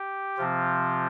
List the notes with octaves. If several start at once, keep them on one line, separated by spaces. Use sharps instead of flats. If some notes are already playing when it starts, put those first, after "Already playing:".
Already playing: G4
C3 F3 C4 F4